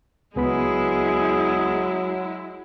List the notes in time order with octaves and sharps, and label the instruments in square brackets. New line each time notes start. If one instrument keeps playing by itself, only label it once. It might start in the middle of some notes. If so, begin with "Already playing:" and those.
[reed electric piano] C#2 B3 B5 [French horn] F#3 [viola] G#3 E4 [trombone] G#4